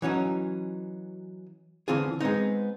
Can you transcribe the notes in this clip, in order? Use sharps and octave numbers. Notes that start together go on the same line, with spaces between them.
E3 F#3 C#4 D#4 F#4
D3 E3 C4 F4 G#4
G#3 B3 C4 D#4